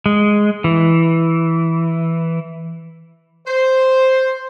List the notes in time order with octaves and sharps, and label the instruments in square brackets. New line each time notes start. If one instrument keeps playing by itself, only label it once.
[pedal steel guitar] G#3
E3
[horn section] C5